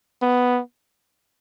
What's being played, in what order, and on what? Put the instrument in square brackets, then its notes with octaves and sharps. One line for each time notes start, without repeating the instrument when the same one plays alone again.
[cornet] B3